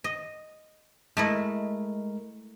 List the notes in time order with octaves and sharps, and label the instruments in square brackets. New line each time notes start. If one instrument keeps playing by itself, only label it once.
[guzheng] D#5
[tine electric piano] G#3 A#4 [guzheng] A3 E4 D#5